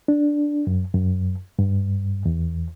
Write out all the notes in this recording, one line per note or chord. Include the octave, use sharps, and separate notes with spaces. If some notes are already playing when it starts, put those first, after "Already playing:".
D4
F#2
F#2
G2
E2